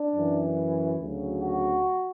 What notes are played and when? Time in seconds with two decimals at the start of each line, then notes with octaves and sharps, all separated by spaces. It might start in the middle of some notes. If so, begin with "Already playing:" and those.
Already playing: D4
0.16 F#2 E3
0.99 D2 C#3 F#3
1.42 F#4